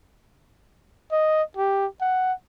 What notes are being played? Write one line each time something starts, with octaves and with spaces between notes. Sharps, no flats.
D#5
G4
F#5